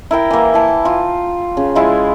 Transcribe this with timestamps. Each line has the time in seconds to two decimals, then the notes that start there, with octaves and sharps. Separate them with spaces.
0.11 E4 A#4 G5
0.31 E3 A#3
0.54 E4 A5
0.85 F4
1.57 C#3
1.75 G#3 E4 F4